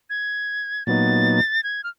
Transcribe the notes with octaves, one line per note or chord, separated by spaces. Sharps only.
G#6
A#2 F#3 B3 D#4 A6
G#6
F6